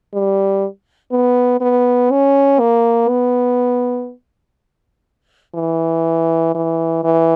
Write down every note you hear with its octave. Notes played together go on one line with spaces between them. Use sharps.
G3
B3
B3
C#4
A#3
B3
E3
E3
E3